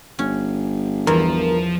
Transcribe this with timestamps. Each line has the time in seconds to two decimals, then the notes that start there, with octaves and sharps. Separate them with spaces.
0.19 G1 C#4
1.07 E2 F3 A#4